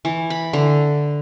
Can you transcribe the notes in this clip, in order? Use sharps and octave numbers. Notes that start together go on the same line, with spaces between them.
E3
B5
D3